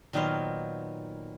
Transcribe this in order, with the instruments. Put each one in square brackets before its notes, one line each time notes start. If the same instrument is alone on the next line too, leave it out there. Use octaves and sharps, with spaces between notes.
[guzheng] A#2 D#3 F#3 B3 C5 F5